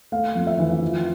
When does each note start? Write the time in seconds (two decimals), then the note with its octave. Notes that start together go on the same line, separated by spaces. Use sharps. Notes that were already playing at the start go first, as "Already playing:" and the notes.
0.12 A3 F5
0.35 F2
0.47 E5
0.59 E3
0.82 F3